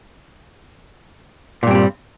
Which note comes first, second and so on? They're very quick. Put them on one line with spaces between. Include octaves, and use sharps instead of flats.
A#2 G2 C4 G3